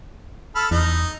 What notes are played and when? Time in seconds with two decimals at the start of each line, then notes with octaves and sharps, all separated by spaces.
0.55 A4 B5 F6
0.71 E2 D#4